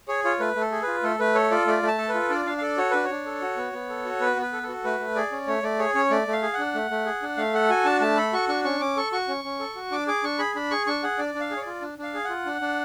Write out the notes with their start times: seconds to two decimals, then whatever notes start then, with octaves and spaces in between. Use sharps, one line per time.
0.08 G#4 C#5
0.24 F4 C#5
0.40 A3 B4
0.56 A3
0.61 A4
0.71 G#4
0.82 B4
0.87 F4
1.03 A3 A4
1.20 A3 B4
1.35 A4 C#5
1.51 F4 D5
1.67 A3 D5
1.83 A3
1.88 A5
1.98 A4
2.09 B4
2.14 F4
2.30 D4 D5
2.46 D4 F5
2.58 F5
2.62 A4 D5
2.78 F#4 C#5
2.91 D4 B4
3.05 C#5
3.10 D4
3.26 A4
3.42 F#4
3.57 B3
3.73 B3
3.89 A4
4.05 F#4
4.20 B3 B4
4.36 B3
4.42 B4
4.53 A4
4.63 A4
4.69 F#4
4.84 A3 B4
5.00 A3
5.15 G#4 D5
5.32 C#4
5.48 A3 C#5
5.63 A3 D5
5.79 G#4 C#5
5.95 C#4 C#5
6.11 A3 D5
6.27 A3
6.33 F5
6.42 G#4
6.53 F#5
6.59 D4
6.75 A3
6.91 A3
7.06 G#4
7.22 D4
7.37 A3 F5
7.54 A4 F#5
7.70 F#4 G#5
7.85 D4 A5
8.01 A3 A5
8.17 A4 B5
8.33 F#4 C#6
8.49 D4 C#6
8.64 C#4 C#6
8.80 C#4 D6
8.97 A4 C#6
9.12 F#4 C#6
9.28 C#4
9.44 C#4
9.60 A4
9.76 F#4
9.92 D4 D6
10.08 G#4 D6
10.24 D4 C#6
10.39 G#4 B5
10.56 D4 B5
10.71 G#4 C#6
10.87 D4 C#6
11.03 G#4 F#5
11.18 D4 D5
11.35 D4
11.40 F5
11.51 G#4
11.57 C#5
11.61 D5
11.66 F4
11.82 D4
11.98 D4 F5
12.14 G#4
12.24 F4 F#5
12.46 D4
12.61 D4